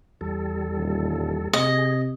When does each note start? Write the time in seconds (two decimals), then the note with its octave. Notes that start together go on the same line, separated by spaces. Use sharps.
0.21 E2 G3 A4
0.77 D#1
1.53 C3 G#4 D#5